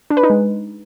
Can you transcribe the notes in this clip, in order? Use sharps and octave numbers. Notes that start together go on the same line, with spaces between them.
D4
B4
D#4
G#3